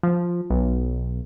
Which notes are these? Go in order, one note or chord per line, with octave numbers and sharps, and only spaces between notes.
F3
B1